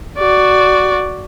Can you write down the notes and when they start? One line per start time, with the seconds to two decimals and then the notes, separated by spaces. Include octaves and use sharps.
0.18 F#4 D5